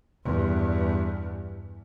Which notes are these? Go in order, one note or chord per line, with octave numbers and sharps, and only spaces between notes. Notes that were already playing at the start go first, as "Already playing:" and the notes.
E2 G2